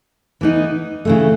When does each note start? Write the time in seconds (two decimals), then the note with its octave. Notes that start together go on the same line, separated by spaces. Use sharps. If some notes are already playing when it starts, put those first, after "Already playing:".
0.41 E3 B3 D#4
1.05 C#3 E3 A3